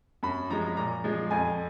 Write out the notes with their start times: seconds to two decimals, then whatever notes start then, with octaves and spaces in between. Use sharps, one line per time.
0.23 F#2 B5
0.50 F3 G#3 A#5
0.77 A#2 A#5
1.04 F3 G#3
1.31 F2 G#5